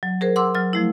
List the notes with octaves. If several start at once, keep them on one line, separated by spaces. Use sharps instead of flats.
F#3
G#4 A#4 C5
F#5 C6 D6 E6
F#3 F6
F3 A3 E4